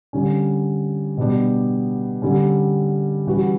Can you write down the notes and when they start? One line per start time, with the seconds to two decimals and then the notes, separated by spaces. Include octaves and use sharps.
0.13 D3 G3 C#4
1.17 B2 G3 B3 D4 G4
2.22 D3 G3 C#4
3.27 E3 G3 C#4 F#4